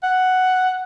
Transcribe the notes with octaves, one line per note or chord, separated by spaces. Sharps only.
F#5